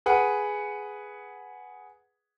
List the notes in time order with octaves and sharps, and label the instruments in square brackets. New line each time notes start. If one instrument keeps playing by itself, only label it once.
[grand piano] G#4 B4 F#5